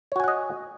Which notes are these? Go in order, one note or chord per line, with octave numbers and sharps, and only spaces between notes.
F#4 C#5 D#5 F#5 G#5